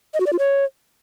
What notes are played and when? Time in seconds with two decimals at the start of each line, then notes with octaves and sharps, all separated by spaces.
0.14 D#5
0.20 F#4
0.26 D5
0.33 F4
0.39 C#5